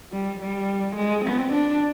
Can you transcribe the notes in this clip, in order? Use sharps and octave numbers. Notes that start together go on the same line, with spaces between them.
G3
G3
G#3
C4
D4